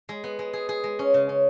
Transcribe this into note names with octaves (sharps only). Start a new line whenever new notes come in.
G#3
B3
G#3
G#4
G#4
G#3
C#4
C#3
C#4